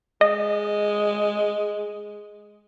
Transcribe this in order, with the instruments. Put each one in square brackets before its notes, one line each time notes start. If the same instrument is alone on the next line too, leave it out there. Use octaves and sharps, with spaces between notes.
[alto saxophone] G#3 [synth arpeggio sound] D#5